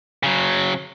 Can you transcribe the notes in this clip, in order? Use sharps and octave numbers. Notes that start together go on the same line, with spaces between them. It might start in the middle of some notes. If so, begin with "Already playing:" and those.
C#3 F#3